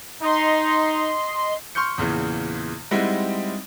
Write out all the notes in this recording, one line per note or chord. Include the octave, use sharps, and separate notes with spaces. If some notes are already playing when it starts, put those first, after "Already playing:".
D#4 D#5 C6
C6 C#6 F6 G6 C#7
E2 A#2 C#3 E3
G3 G#3 C4 D#4 E4 F#5